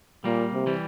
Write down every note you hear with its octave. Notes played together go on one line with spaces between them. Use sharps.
A#2 G3 A#3
C3
E3 G3